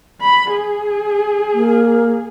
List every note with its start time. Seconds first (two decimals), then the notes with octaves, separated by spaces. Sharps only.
0.21 B5
0.53 G#4
1.54 A#3